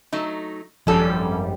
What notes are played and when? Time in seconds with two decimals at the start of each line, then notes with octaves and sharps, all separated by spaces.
0.12 F#3 A3 D#4
0.87 G#1 F#2 F3 G3 C#4 A4